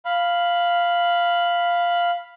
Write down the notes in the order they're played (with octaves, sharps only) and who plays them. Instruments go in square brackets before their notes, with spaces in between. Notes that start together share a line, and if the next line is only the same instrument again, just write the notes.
[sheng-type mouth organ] F5 B5